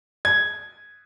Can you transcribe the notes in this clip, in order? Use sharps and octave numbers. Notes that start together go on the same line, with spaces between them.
G#6